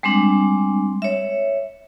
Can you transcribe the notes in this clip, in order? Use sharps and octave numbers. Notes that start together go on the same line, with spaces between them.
G3 G#3 C4 D4
C#5 E5